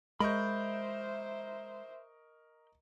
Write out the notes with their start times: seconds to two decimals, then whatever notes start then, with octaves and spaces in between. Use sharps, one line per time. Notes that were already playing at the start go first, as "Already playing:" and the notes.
0.20 G#3 A#4 C5 D#5 E5 B5 C#6 G6